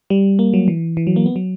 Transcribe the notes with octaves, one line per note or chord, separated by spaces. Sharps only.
G3
A#3
F#3
E3
E3
F#3
A#3
B3
F#3